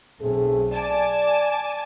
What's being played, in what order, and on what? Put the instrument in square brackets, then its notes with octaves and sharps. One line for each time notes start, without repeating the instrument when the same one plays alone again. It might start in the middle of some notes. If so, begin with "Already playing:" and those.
[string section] B1 [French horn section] A3 C4 G#4
[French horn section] D5 [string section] G#5 A5 D6